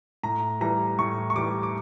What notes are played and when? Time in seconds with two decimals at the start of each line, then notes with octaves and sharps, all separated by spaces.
0.23 A2 A#5
0.61 E3 G3 A#5
0.99 A2 C#6
1.30 C#6
1.36 E3 G3 D6
1.63 D6